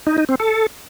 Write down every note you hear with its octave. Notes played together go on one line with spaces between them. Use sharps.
D#4
D#4
C4
A4